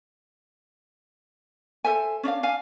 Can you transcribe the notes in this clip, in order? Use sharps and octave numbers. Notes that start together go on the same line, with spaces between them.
A4 C5 E5 G#5
C#4 D4 D#5 F5
D4 F5 G#5